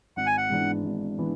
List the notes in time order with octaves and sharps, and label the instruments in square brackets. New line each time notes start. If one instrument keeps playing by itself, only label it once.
[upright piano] G#1 [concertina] F#5
[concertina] G#5
F#5
[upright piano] G#2 E3 B3 D4
G#1
E3 B3 D4